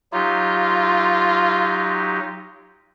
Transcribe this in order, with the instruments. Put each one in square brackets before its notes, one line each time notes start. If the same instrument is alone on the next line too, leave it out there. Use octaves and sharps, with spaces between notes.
[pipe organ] F#3 D#4 G4 [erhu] F4